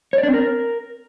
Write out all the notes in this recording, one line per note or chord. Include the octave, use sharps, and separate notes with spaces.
C#5
D5
D4
C4
A#4